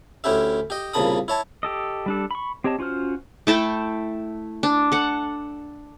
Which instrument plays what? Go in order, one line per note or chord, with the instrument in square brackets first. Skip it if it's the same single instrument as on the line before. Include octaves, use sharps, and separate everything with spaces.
[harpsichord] D2 C#4 E4 G4 E5
G4 D#5
C2 A#2 C#3 A5 B5 D#6
E4 C#5 A5
[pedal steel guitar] G4 A4 D#5
G3 D4 A4
B5 C#6
C4 G4 C#5 D#5 A5
C#4 F4 F#4 C5 F6
[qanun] A3 E4 A4 G5
D4
A4 F#5